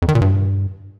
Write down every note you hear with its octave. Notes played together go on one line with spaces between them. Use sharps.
F2
D#3
A#2
G2